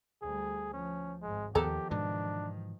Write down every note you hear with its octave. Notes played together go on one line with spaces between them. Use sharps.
D2 G3 G#4
F3 C#4
G#1 G#2 G#3
D#2 D#3 F3 B3 G4 A4 A#4
G#2 B2 E3 D4